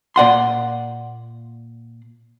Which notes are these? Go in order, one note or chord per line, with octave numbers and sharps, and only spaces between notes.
A#2 D5 F#5 C6